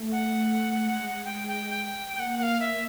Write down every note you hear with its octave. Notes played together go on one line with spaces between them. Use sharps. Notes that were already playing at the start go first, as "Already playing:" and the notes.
Already playing: A3
F#5
G#3
G5
G5
G5
A#3 F#5 G5
F#5
F5
E5